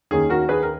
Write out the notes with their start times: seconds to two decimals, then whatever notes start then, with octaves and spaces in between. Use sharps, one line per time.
0.11 D#2 D#3 A#3 C#4 G#4
0.30 F#4 A#4
0.49 G#4 B4
0.63 A#4